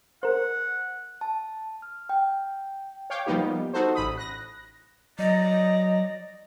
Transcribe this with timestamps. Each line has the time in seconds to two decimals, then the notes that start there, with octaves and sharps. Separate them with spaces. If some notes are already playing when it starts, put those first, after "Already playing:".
0.23 A#4 C5 F#5
1.21 A5
1.82 F6
2.09 G5
3.10 C#5 F5 G5 D6
3.26 F3 G3 A#3 B3 D#4 G4
3.74 D#4 F#4 A4 C5
3.95 A1 B5 D#6
4.17 F#6 A#6
5.19 F#3 D5 D#5 A#5